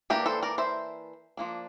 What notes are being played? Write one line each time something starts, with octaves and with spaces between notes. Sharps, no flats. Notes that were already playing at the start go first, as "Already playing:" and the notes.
E3 A#3 D4 G4 A#4
A4 C5
A#4 D5
C5 E5
F3 A#3 D4